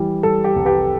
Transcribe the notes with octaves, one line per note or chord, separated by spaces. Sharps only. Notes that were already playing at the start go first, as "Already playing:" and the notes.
Already playing: E3 G3
G3 A4
G4
C2
G4 B4